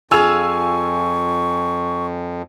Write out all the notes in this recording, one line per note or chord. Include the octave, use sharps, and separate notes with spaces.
F2 F4 G#4 G#5 C#6 E6 F7